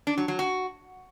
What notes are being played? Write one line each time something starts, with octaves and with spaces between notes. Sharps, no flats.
D4
F#3
F#3
F#4